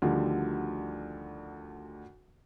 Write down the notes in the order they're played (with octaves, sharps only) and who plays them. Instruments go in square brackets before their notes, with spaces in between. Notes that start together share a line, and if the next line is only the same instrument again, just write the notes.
[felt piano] D2 D3 D#3 F3 G3